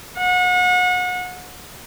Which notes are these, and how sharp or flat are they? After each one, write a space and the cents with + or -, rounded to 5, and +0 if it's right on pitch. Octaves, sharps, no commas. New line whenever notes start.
F#5 -35